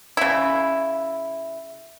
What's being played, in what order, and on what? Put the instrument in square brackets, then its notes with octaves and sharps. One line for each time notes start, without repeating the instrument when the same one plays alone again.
[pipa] C#3 E4